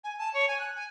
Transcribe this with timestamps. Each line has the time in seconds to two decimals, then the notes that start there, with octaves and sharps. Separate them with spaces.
0.03 G#5
0.18 A5
0.33 C#5
0.48 G#5
0.59 F#6
0.75 G#5